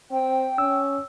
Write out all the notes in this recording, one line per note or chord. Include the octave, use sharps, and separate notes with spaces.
C4 G5
C#4 E6